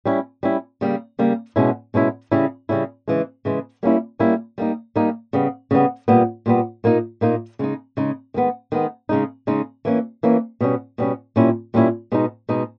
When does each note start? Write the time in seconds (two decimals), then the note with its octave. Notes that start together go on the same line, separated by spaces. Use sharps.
0.05 G3 C#4 E4
0.43 G3 C#4 E4
0.81 C#3 G3 A#3
1.19 C#3 G3 A#3
1.56 B2 G#3 C#4 E4
1.94 B2 G#3 C#4 E4
2.32 C#3 G3 C#4 E4
2.69 C#3 G3 C#4 E4
3.08 C#3 E3 G#3
3.45 C#3 E3 G#3
3.83 G3 A#3 C#4 E4
4.19 G3 A#3 C#4 E4
4.58 G3 A#3 D#4
4.96 G3 A#3 D#4
5.33 C#3 G3 B3
5.71 C#3 G3 B3
6.08 A#2 G3 B3
6.46 A#2 G3 B3
6.84 A#2 A#3 D#4
7.21 A#2 A#3 D#4
7.59 C#3 G#3 D#4
7.97 C#3 G#3 D#4
8.34 D#3 G#3 B3
8.72 D#3 G#3 B3
9.09 C#3 G#3 D#4
9.47 C#3 G#3 D#4
9.85 E3 A#3 C#4
10.23 E3 A#3 C#4
10.61 B2 G3 C#4
10.98 B2 G3 C#4
11.36 A#2 G3 C#4 E4
11.74 A#2 G3 C#4 E4
12.12 B2 G#3 D#4
12.49 B2 G#3 D#4